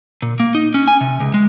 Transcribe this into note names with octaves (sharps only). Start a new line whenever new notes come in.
A#2
A#3
D#4
C#4
G#5
C3
C#2
G#3